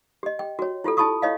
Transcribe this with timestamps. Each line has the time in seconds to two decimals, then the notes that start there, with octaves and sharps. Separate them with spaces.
0.23 G4 D#5
0.39 G5
0.59 F#4 C#5
0.84 E4 F4 G4 A4
0.97 E4 G#5 A5 B5 C#6 D#6
1.22 E4 C#5 D#5 F5